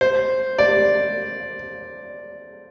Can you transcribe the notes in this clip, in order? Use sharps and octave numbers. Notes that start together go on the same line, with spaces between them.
C5
D5